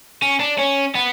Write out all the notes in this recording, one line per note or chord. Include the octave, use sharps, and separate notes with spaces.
C#4
D4
C#4
B3